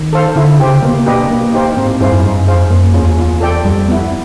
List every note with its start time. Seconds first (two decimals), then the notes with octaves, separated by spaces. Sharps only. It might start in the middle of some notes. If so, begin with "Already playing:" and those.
Already playing: D#3
0.13 A4 C5 F5
0.36 D3 E4
0.60 C#3 G4 C5
0.82 B2 A#3
0.95 C3
1.06 B2 D4 G4 B4 D#5
1.30 A#3
1.53 D#4 G4 C5 F5
1.77 G#2 C4
1.89 A2
2.00 G2 E4 G#4 C5 F5
2.12 F#2
2.24 G2 D#4
2.39 F#2
2.47 G#4 C5 F5
2.55 F2
2.70 F#2 A#3
2.94 E2 C#4 F4 G#4
3.17 E2 F4
3.41 A4 D5 G5
3.64 F2 G3
3.88 B3 E4